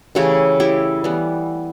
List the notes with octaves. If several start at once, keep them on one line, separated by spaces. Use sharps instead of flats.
C#3 E3 A3 E4 G4
E4 G4
E3 G3 B3